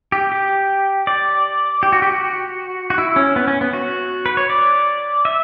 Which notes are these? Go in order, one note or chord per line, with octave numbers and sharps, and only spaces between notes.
G4
G4
D5
G4
F#4
G4
F#4
F#4
E4
C#4
B3
C#4
B3
F#4
B4
C#5
D5
E5